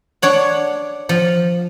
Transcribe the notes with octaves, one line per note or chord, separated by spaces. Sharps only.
D4 C#5 F#5
F3